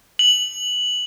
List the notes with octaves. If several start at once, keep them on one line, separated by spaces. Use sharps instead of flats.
F#7